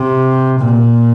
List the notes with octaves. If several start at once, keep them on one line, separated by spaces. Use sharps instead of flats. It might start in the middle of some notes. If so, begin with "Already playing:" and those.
Already playing: C3
A#2